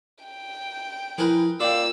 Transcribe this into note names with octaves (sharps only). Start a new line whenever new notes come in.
G5
F3 E4 G#4 A#4 B4
A#3 F4 D5 F5 G5 E6